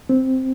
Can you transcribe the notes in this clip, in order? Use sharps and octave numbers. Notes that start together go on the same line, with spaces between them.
C4